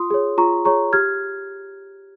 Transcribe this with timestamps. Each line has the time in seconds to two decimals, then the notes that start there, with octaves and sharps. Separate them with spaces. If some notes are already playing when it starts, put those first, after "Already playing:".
Already playing: F4 C6 D#6
0.11 G#4 C#5
0.38 F4 A#5 C#6
0.65 G#4 C#5 A#5 C#6
0.93 G4 F6 G#6